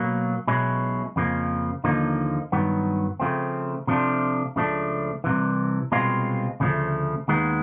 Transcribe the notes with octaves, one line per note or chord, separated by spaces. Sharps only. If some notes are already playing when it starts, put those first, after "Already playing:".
Already playing: B2 F#3 A#3
B1 B2 G#3 C#4 E4
F2 C#3 F3 A#3
D#2 D3 F3 A#3 D#4
G2 D#3 F#3 B3
C#3 F3 A3 C4
C3 F3 A3 D4 F4
C#2 C#3 F3 A3 D4
C2 C3 E3
C2 B2 G#3 C4 F4
D2 C#3 F3 A3
D#2 D#3 G#3 B3